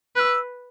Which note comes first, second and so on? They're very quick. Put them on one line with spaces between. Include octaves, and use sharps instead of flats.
B4 F#6 E6